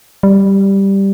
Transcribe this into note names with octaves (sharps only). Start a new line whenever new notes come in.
G3